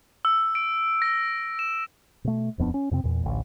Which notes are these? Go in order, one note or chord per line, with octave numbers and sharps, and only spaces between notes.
E6
D7
A#6
E7
B2 A3
D#1 F2 B3 D4
C#4
F2 C3 C4
E2 A#2
A1 D2